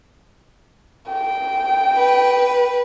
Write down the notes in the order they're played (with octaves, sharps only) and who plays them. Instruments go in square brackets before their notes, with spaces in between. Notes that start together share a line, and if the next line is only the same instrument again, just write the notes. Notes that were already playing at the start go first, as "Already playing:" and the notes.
[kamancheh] G5
[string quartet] B4